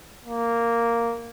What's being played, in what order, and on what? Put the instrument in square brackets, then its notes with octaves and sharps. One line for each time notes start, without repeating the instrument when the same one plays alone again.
[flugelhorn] A#3